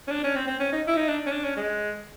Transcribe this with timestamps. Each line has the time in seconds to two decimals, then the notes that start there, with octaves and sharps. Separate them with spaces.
0.08 C#4
0.11 D4
0.24 C#4
0.36 C4
0.48 C4
0.60 C#4
0.72 D#4
0.87 E4
0.96 D#4
1.08 D4
1.26 C#4
1.32 D4
1.44 C#4
1.57 G#3